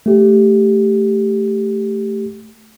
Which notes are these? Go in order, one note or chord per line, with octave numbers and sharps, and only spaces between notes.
A3 G4